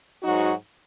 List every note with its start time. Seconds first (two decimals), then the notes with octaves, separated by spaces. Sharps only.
0.23 G#2 F#3 D#4 F#4